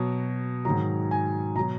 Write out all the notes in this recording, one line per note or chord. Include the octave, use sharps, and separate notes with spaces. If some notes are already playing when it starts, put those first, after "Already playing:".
Already playing: B2 F#3
G#2 D#3 F#3 A#5
G#5
B2 F#3 A#5